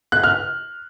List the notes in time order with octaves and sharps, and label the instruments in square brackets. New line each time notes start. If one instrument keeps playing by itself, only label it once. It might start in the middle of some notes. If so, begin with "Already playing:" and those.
[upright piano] F#6
F6